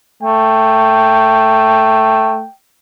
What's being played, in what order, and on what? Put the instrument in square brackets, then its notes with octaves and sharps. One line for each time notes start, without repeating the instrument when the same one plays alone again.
[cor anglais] A3 [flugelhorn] G5